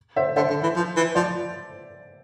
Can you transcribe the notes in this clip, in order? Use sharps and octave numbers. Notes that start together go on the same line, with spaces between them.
C5 E5
D3 C5 E5
D3
E3
F3
E3
F3 D5